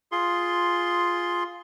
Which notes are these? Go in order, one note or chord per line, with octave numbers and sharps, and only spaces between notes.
F4 G#4 C6